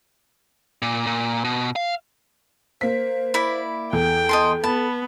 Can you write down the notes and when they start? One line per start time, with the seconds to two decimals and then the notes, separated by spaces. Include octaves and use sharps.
0.82 A#2
1.07 A#2
1.44 B2
1.76 F5
2.81 A#3 C5 B6
3.34 E4 D5 B5
3.93 E2 A4 G5
4.29 D#5 A5 C6
4.64 B3 A5 B5